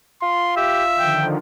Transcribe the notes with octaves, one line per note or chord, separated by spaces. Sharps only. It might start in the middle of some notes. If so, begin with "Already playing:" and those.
F4 C6
G4 E5
D3 D#3 F3 G5